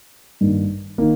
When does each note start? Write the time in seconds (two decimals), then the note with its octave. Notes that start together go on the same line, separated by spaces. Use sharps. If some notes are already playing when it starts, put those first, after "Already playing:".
0.41 G2 D#3 A#3
0.98 D#3 A#3